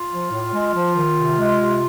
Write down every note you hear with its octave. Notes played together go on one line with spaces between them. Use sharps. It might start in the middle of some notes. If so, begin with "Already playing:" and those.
Already playing: F4
F3
A2
G#3
F3
D#3
C3
G#3
C3